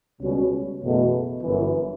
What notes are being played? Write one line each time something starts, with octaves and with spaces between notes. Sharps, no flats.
C#2 B2 G3 C#4 F#4
F#1 E2 B2 A3
G1 F#2 E3